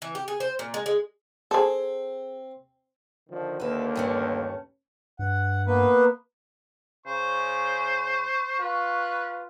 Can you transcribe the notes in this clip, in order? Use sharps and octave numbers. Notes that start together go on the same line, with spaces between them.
E3
G4
G#4
C5
A#2
G#3
G#3
C4 G#4 A4
D3 D#3 F3
D#2 D3 A#3 B4 E5
G2 A3 C#4
G2 F#5
A#3 B3 B4
C#3 C5 C#6
F4 B4